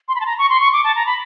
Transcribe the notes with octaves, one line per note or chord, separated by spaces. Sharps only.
C6
B5
A5
A#5
C#6
C6
C#6
D6
A5
A#5
B5